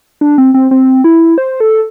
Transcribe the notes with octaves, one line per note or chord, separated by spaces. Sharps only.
D4
C4
C4
C4
E4
C5
A4